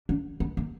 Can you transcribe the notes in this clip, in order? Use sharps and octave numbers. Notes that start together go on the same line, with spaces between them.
D4
B3
A#3